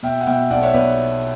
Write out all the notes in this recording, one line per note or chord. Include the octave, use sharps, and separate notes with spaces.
B2 E5 G5
F#5
B2 E5 G5
B1 D5 F#5
C#5 E5
B1 B4 D5